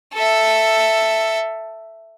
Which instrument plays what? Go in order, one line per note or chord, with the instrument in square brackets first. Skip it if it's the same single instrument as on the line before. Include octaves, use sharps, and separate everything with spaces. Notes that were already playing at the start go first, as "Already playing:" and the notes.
[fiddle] A4 E5